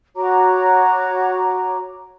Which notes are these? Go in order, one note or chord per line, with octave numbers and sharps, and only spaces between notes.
F#4 C#5 A#5 D6